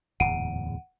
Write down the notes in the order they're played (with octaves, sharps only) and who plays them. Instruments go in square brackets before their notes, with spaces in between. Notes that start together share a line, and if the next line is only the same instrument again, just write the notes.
[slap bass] D1 E2 G#2 [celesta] F#5 D7 D#7